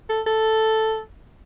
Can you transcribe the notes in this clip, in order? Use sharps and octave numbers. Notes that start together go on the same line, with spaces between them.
A4
A4